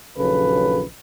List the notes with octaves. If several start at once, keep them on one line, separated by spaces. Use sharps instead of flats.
A#1 D#2 C#3 F#3 A4 B4